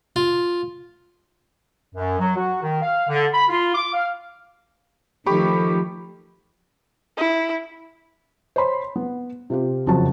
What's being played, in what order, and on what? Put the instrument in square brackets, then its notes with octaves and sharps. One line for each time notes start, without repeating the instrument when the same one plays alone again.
[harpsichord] F4
[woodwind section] F#2
F#3
F#4
D#3
F5
D3
B5
F4
D6
F5
[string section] D#3 F3 A3 [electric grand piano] G4 B5 C#6
[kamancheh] E4
[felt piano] C5 C#5 B5 C6
B3
C3 F4 G4
F#1 F2 F#3 F#4 A5